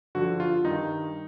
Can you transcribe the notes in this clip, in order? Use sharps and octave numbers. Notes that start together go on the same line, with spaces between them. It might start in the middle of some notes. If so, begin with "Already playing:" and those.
G2 D3 F3 F#4
F4
G2 D#3 D#4